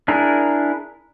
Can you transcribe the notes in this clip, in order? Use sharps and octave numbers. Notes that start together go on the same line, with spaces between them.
D4 E4 G#4 A#4